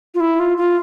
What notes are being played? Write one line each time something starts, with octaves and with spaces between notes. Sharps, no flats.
F4
E4
F4
F4